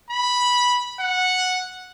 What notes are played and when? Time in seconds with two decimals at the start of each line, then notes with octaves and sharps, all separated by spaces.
0.11 B5
1.00 F#5